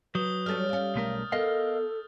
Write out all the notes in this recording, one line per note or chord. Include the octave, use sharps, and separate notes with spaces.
F#3 B4 D#6 G6 G7
G3 A3 C#4 F6 A6
G3 C#4 F5
B1 A3 A#4
B3 A4 A#4 D#5 F5